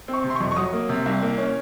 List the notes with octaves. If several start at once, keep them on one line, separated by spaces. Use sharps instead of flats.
C4
C#6
C3
C6
C#6
F2
C#6
F#3 D#6
A#3
C3
C2
A#3
C#4